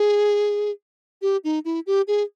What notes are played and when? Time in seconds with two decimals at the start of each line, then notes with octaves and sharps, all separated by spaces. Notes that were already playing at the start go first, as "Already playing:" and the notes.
Already playing: G#4
1.22 G4
1.44 D#4
1.65 E4
1.87 G4
2.08 G#4